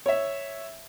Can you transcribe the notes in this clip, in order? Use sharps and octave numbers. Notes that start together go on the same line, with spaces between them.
C#5 E5